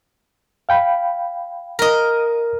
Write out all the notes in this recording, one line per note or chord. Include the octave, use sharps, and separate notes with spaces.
F5 G5 B5
A#4 D#5